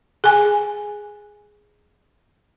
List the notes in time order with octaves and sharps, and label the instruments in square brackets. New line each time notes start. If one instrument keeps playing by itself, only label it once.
[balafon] G#4 G#5